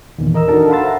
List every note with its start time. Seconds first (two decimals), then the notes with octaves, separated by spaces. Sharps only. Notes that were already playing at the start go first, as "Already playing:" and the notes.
0.18 E2 A#2 D#3 E3
0.34 A#4 D#5 A#5 E6
0.48 D4 D#4 F#4 A4 A#4 A5
0.69 F5 F#5 B5 C6 E6 A6
0.83 C5 E5 F#5 A#5